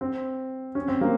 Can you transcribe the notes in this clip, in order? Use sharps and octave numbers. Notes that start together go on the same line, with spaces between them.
C4
C#4
C4
A#3